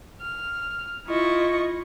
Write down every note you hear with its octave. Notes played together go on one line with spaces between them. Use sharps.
F6
E4 F4 D#5 C#6